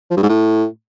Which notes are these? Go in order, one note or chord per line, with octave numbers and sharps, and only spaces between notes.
F3
G2
G#2
A2